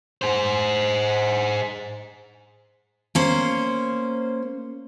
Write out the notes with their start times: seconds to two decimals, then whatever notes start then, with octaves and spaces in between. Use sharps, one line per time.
0.22 G#4 C5
3.15 A#3 C#4 C5